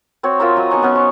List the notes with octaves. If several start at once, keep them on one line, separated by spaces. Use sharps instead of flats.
C4 F#4 C#5
F4 A#4 E5 A#5
F#3 D#5
B3 D#4 G#5 C#6
B3 C#4
C5 C#6